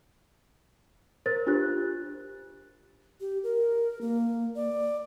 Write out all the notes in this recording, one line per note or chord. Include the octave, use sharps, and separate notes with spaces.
A#4 C5 A6
D4 F4 G4 C5 F#6
G4
A#4
A#3
D5